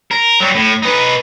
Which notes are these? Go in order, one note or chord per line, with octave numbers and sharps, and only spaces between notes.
A#4
F#3 G3
A2
D#4 B4